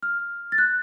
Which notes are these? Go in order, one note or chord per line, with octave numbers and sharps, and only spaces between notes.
F6
A6
F#6